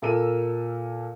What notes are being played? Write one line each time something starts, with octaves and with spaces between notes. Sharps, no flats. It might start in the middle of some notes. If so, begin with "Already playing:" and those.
A#2 A4 A#4 E6 D#7